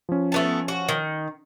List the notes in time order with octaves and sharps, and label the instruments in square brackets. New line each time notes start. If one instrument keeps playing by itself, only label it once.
[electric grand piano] F3 C#4
[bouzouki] A3 B3 A5
F#4
D#3